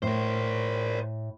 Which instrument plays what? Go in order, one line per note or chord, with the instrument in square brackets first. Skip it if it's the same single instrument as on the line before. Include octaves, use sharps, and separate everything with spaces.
[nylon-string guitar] A2 [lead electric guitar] A#4 C5